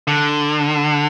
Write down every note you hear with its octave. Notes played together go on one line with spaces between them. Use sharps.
D3